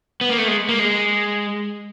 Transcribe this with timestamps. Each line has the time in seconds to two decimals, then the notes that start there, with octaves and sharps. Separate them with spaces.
0.21 B3
0.30 A#3
0.38 A3
0.48 G#3
0.69 A#3
0.79 G#3